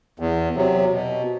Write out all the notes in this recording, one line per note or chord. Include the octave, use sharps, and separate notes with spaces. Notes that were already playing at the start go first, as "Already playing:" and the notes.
E2
C3 F#3
B2